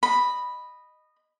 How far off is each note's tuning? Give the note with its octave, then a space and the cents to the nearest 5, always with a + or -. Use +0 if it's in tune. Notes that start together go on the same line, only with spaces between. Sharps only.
D#5 -15 B5 +0